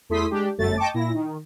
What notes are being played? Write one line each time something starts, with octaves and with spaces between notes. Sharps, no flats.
E2 A3 E4 C6 D#6 B6
G#3 D4 G4
G1 F#2 A3 A6
D#5 G5 A5 C#6 D6
A#2 E4 A#6
D#3